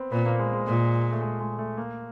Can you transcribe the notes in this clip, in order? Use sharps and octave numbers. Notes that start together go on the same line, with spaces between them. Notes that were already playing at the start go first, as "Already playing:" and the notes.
Already playing: B3 C4
A#2 B3
A#3
G#3
G#3
A#2 G#3
A3
G#3
G#3
A3
A#3